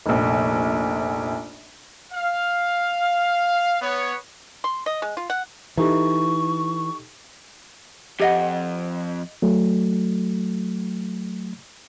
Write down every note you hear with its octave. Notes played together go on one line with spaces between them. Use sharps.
F1 A#1
F5
B3 C#5
C6
D#5
G#3
F4
F#5
E3 D#4 G4 A4 C#6
F2 G4 D#5 F#5
F#3 A3